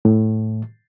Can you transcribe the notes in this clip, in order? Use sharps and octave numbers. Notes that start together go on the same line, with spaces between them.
A2